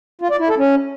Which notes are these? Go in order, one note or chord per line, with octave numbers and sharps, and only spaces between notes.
F4
D5
E4
A4
C#4